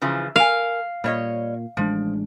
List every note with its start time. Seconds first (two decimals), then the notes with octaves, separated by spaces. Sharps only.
0.02 C#3 E3 F3
0.36 A#4 F5 G#5
1.04 A#2 G3 C#5 D#5
1.77 A1 F3 G#3 D4